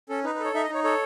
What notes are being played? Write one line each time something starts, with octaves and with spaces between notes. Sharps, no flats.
C#4 A4
D#4 B4
B4
A4 C#5
D#4 E5
D#5
D#4 C#5
A4 C#5